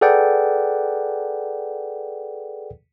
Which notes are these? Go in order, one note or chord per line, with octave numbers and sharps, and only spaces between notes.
G#4 A4 B4 D5 F#5 G5